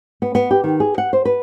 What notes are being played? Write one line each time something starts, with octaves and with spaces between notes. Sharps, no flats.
B3
B3
G4
D#3
G#4
F#5
C5
B4